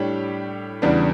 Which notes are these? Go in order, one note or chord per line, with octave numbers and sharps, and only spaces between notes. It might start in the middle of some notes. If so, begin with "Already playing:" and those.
Already playing: A2 G3 D4 G4 C#5
E2 C#3 G3 B3 D4